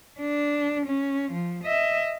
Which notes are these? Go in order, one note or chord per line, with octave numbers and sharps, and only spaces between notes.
D4
C#4
F3
D#5 E5